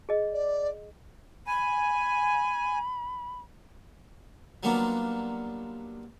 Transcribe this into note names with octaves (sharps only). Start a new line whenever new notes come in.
G#4 D#5
D5
G#5 B5
F#3 G3 A#3 B3 D4 F4